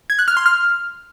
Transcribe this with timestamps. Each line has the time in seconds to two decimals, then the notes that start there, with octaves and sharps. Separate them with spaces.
0.10 G#6
0.19 F#6
0.28 F6
0.37 C6
0.46 F6